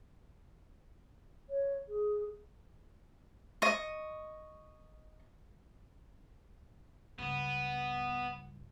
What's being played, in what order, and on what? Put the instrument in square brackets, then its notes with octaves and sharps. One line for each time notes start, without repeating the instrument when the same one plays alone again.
[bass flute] C#5
G#4
[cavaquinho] D#5 C#6
[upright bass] C#2 G2 [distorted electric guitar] B3